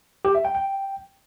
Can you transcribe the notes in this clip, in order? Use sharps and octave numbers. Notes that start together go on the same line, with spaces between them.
G4
E5
G5
G5